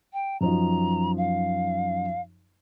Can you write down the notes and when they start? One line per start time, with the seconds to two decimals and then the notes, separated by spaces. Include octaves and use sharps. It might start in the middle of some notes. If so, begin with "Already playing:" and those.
0.13 G5
0.41 F#2 F3 D#4 A#5
1.17 F5